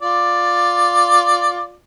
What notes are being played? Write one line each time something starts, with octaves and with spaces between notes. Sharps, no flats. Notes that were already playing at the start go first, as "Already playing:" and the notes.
F4 D5